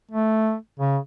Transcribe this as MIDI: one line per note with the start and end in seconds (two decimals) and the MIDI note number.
0.11 0.55 57
0.79 0.97 49